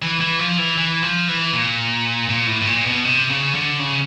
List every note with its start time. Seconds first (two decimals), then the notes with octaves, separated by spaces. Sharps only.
0.02 E3
0.21 E3
0.39 F3
0.58 E3
0.78 E3
1.02 F3
1.28 E3
1.53 A#2
2.29 A#2
2.47 A2
2.61 A2
2.67 A#2
2.85 B2
3.04 C3
3.29 C#3
3.54 D3
3.79 C#3